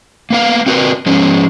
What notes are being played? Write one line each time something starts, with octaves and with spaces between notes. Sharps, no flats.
A#3 B3 F5
C4 F#4 A#4 B4
F3 G#3 B3 C#4